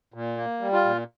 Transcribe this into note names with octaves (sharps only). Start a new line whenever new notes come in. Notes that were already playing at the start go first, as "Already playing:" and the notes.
A#2
A#3
G3
F4
A#2